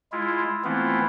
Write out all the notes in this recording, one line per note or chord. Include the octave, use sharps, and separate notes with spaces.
G#3 E4 F4
E3 A3 B3 C4 E4 F4